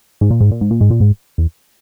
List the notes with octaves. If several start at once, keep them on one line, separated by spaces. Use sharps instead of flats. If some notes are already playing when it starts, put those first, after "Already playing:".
G#2
A#2
G#2
A#2
G#2
A#2
G#2
A#2
G#2
E2